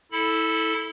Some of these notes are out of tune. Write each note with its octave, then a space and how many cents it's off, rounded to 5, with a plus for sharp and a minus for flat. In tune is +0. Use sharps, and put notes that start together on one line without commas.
E4 -25 A4 +0 B5 +0